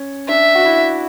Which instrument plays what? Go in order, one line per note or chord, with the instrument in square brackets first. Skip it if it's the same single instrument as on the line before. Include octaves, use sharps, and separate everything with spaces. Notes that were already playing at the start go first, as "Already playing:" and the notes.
Already playing: [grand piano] C#4
[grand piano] D4 [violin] E5
[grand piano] F#4
E4